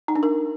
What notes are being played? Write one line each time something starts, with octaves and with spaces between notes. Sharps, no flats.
D#4
D4
A#4